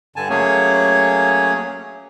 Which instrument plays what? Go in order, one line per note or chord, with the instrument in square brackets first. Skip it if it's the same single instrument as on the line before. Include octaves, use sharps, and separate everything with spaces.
[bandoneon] G2 D3 G#5 A5
F#3 A3 A#3 C#4 G#4 C#5